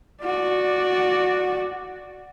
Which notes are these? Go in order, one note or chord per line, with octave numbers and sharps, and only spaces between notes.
F#4 D5